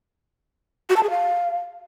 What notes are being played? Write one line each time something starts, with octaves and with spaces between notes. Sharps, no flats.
F#4
A5
G#4
F5